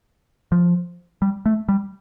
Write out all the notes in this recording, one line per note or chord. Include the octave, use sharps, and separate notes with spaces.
F3
G3
A3
G3